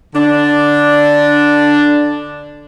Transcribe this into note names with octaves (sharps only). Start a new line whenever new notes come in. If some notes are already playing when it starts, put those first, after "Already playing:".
D3 D4